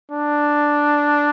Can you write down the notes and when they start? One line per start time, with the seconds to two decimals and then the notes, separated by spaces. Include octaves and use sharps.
0.12 D4